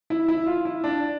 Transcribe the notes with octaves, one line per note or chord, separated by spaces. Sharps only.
E4
E4
F4
E4
D4